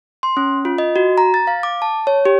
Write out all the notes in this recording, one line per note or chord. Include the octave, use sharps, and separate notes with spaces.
C6
C#4
F4
D#5
F#4
A#5
A6
F5
D6
A5
C#5
G4